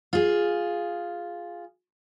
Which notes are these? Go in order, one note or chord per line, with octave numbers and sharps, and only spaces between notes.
F4 G#4